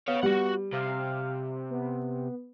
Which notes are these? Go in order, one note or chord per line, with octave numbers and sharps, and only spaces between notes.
B3 C#5 F5
G3 F#4 F#5
C3 F5
B3